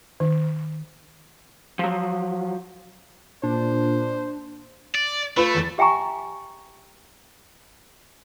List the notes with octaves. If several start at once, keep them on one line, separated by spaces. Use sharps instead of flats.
D#3
F3 F#3
A#2 D4 C5
D5
A3 F4 B4 B5
E2 A6
G4 E5 G5 G#5 A#5 C#6